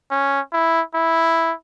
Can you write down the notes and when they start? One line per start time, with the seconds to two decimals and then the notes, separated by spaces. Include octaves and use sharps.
0.11 C#4
0.53 E4
0.95 E4